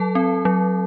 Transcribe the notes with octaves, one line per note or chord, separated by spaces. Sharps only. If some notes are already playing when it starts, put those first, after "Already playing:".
Already playing: F#3 A4 A5
C4
F#3